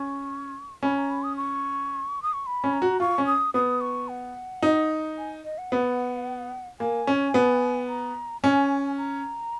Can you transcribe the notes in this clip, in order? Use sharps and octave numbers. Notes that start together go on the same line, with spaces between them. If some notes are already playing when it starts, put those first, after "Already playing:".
Already playing: C#4 C#6
C#4 B5
A#5
B5
D#6
C#6
D#6
C#6
B5
C#4
A#5
F#4
F4 C#6
C#4
D#6
B3 D#6
C#6
F#5
D#4
G#5
D#5
F#5
B3
A#3 G#5
C#4
B3
A#5
C#4 G#5
A#5